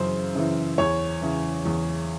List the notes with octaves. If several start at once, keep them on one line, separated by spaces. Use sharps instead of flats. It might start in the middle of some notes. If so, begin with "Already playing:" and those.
Already playing: F#2 C#3 E3 C5
C#3 E3
E2 C#5
C#3 E3
E2